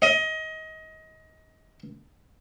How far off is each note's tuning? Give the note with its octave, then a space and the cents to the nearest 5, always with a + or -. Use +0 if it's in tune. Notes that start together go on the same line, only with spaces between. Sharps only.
D#5 +25